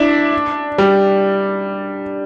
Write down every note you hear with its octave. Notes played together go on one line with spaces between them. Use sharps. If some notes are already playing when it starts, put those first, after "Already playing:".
Already playing: D4 E4
G3